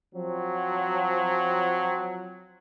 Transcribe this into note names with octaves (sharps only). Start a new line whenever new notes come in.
F3 F#3 C4